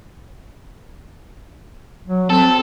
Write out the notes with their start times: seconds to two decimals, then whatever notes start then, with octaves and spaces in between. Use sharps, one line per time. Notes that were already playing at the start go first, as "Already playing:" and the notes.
2.07 F#3
2.30 C4 A4